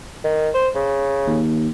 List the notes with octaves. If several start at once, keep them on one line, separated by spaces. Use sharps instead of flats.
D#3
C5
C#3
D#2